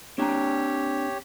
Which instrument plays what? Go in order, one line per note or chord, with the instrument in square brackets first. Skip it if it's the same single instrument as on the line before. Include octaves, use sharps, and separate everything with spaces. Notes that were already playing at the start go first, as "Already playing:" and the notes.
[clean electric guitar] C4 D4 A#5 [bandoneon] G4 C#5